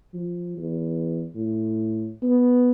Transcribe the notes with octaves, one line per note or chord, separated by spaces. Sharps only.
F3
E2
A2
B3